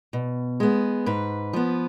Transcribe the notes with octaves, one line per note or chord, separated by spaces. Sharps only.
B2
G#3 B3
G#2 B4
F3 B3